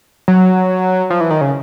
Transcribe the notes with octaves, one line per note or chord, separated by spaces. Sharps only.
F#3
F3
E3
D#3
C#3